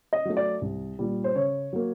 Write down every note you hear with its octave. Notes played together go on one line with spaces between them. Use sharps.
D#5
F#3 A3
D5
C2
A#2 G3
C5
C#3 C#5
F#3 A#3